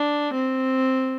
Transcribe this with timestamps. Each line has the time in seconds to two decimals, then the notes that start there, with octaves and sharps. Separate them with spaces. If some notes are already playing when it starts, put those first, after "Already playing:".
Already playing: D4
0.34 C4